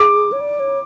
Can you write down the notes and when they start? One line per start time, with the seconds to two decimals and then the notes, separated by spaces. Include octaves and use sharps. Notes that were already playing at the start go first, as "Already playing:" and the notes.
Already playing: G#4 D6
0.32 C#5
0.41 D5
0.59 C#5